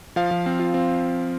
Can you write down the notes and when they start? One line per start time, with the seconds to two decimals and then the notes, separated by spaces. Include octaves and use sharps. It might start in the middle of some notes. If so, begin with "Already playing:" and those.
0.16 F3 F5
0.31 F3
0.46 C4
0.60 F4
0.74 C4